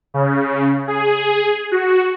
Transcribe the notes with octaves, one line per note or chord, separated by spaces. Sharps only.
C#3
G#4
F#4